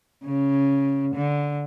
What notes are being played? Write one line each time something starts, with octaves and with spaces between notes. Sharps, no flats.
C#3
D3